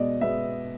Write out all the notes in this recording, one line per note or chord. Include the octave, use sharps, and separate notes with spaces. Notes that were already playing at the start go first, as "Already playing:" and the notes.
Already playing: B2 G#3 B3 D5 D#5
B2 G#3 B3 E5